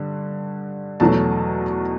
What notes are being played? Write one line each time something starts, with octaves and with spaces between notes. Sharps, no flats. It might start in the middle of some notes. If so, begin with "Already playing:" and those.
Already playing: G2 D3
E2 B2 F#3 A3 A5